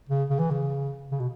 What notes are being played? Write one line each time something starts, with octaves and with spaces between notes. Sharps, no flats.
C#3
C#3
E3
C#3
C#3
B2